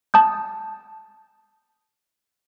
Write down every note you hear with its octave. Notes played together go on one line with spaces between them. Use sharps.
A5 D#6 G6